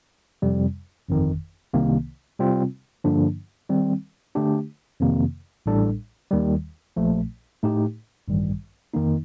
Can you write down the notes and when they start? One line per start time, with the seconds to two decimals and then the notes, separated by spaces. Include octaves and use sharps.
0.42 F2 C3 G3
1.09 G1 F2 D#3
1.74 C2 C3 D#3 A#3
2.39 C3 G3 C4 F4
3.04 G2 D3 F3 A#3 D4
3.70 D#3 G3 C4
4.35 D3 A3 D4 G4
5.00 F2 C3 D#3 A#3
5.66 A1 A2 G3 D4 A4
6.31 D#2 D#3 G3
6.96 A#1 A#2 F3 A3
7.63 A2 A3 D#4 G4
8.28 A1 G2 D#3 G3
8.94 F2 D#3 A#3 D#4